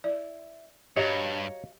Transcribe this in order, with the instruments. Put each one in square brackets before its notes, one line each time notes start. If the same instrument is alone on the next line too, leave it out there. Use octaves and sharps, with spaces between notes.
[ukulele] E4 [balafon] D5
[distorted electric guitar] G2 [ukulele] F#4 D#5 F5 [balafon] G4 [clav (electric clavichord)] C#5 A#5